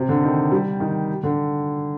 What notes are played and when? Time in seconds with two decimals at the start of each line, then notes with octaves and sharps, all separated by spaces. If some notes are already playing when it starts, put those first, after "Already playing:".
Already playing: C3
0.09 D3
0.23 D#3
0.51 G3
0.80 D#3
1.23 D3